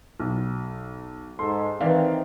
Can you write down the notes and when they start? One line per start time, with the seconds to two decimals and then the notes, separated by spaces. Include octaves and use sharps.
0.20 B1
1.39 G#2 A4 C6
1.81 D#3 E3 C4 D5 F5